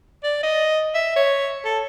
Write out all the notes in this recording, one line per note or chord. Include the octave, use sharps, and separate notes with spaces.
D5
D#5
E5
C#5
A4